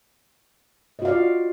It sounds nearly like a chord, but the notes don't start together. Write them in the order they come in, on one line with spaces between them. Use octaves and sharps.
D#5 F#4 F5 D5 F4